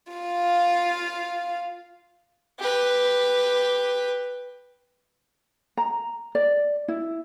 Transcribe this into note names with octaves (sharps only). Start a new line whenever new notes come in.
F4 F5
G4 B4
A#5
D5
E4